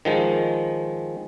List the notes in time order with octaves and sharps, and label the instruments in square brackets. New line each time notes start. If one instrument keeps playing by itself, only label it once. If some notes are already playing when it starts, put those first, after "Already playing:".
[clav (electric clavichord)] D#3 F3 G#3